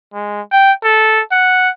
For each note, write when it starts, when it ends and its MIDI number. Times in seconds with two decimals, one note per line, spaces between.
0.14 0.41 56
0.52 0.72 79
0.84 1.20 69
1.32 1.70 78